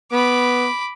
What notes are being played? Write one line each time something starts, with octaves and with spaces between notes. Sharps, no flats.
B3 B5 D6